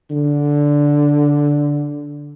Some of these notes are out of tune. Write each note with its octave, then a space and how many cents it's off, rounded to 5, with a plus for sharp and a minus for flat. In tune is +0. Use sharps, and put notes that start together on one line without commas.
D3 -10